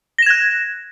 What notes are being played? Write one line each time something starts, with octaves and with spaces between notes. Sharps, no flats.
F#6 G#6 A#6 E7